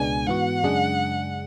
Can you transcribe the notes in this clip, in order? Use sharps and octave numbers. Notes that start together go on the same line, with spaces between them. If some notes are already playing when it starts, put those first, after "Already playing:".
Already playing: C#2 B2 G#3 B3 D4 G#5
G#2 E3 B3 F#4 F#5
F#2 C#3 G#3 D4 G#4